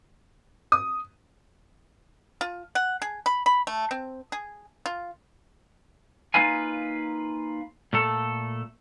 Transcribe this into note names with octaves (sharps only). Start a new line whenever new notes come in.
D#6
F4
F#5
G#4
B5
B5
A3
C4
G#4
F4
A#3 D#4 F4 B4 F5 G#5
A#2 A3 A4